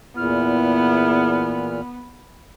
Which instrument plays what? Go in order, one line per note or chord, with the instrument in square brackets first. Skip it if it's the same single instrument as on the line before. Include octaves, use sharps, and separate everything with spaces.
[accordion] E2 A#2 F6 [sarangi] B3 [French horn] E4